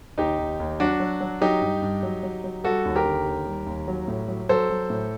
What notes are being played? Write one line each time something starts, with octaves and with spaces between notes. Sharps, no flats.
D#2 D#4 G4
D#2
D#2
F#3 D4 F#4
F#3
F#3
F#3 D#4 G4
G2
G2
F#3
F#3
F#3
G3 F#4 A4
D#2
G4 A#4
D3
D#2
G3
D#2
F#3
A2
F#3
F#3 A4 C5
F#3
A2